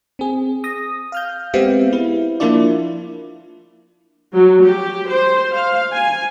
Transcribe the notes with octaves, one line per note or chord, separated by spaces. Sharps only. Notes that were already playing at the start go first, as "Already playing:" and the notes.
C4 G#4
D#6 A#6
F5 F6 G6
G#3 B3 C4 G4 E5 F5
E4
F3 A#3 D4 E4 F4 D5
F#3
G4
C5
F5
G#5